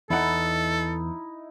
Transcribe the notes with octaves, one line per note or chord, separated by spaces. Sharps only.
E2 D#4 E4 A4 F#5